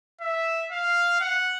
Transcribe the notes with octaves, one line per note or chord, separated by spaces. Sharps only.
E5
F5
F#5